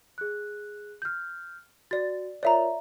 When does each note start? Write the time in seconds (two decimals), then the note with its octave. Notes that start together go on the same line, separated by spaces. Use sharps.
0.18 G#4 F#6
1.02 F6 G6
1.91 F#4 D5 A6
2.43 F4 A#4 C#5 D5 E5 A#5